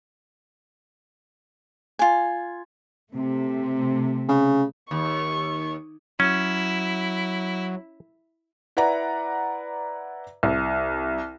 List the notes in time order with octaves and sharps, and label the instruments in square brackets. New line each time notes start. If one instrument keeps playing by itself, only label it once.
[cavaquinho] F4 G#5
[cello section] C3 A3
[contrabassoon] C#3
[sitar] D#2 [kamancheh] C#6
[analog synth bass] F#3 [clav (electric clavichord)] C#4 [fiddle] E4
[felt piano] E4 B4 D5 F#5 A#5
C2